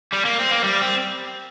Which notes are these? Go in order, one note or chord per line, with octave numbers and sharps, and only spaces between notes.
G3
A#3
C4
A#3
G3
C4